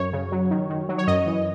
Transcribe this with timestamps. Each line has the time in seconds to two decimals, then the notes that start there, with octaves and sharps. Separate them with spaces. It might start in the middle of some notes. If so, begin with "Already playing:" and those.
Already playing: F#2 F#3 C#5
0.13 C#3
0.32 F#3
0.51 D#3
0.70 D#3
0.89 F#3
0.98 C#5
1.07 F#2 D#5
1.26 E3